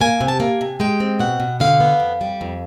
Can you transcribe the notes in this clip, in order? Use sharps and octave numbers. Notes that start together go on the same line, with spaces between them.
A#3 G#5
C3
A5
A#3 G#5
C3
G#3 G5
C4
B2 F#5
B2
D3 F5
B3
F2
G3
F2